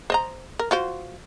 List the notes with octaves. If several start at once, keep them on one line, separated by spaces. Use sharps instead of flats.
C5 D#5 A#5
A#4
F4 F#4 C5